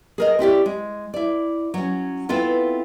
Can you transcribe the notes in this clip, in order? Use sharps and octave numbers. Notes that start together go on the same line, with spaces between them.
G#4 A#4 D#5
C4 E4 G4 D5
G#3
E4 D5
F#3 C#4
B3 C4 E4 F4 A4